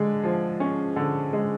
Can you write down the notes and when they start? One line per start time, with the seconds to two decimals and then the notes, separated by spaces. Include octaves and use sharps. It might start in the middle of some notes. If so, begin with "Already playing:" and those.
Already playing: D3 G#3
0.24 F3
0.60 C#4
0.96 D3
1.33 G#3